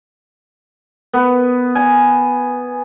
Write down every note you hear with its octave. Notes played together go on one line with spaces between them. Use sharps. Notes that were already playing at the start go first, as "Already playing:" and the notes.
B3
G#5